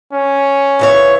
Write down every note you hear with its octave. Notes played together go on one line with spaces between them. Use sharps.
C#4
C#3 E3 C#5